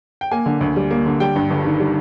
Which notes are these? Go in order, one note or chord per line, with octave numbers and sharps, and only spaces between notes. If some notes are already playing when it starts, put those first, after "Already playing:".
G5
A#3 G#5
D3
D2
G3
A#3
D3
G3 G5
G2
G1
D#3
G3